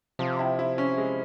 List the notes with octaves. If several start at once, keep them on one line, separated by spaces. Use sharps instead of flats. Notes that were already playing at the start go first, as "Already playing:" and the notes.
C3 F3
E4
E4
C#4
G#3